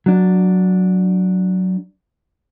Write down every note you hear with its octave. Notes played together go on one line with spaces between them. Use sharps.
F#3 D4